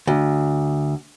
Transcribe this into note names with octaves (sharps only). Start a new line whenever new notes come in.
D2